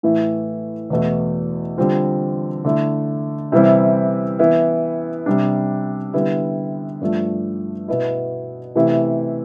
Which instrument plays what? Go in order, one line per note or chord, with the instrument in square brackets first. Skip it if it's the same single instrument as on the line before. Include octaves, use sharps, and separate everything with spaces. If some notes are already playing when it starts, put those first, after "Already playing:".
[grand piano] A2 E3 A3 E4
E2 B2 A3
D3 G3 C4 F4
D3 A3 E4
C3 E3 G3 C4 E4
E3 B3 E4
C3 G3 D4
D3 G3 B3 E4
G2 F3 A3
B2 B3 E4
C3 E3 A3 E4